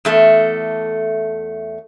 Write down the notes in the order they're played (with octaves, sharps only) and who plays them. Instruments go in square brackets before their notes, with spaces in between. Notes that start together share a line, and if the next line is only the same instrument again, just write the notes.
[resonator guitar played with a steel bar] E2 A3 A4